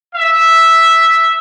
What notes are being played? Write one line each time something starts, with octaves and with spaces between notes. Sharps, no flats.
E5